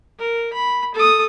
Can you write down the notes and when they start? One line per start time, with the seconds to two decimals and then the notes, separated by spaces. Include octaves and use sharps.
0.19 A#4
0.53 B5
0.95 A4 D#6